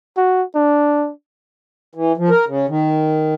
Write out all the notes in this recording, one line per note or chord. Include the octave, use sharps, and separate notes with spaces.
F#4
D4
E3
F3
A#4
C#3
D#3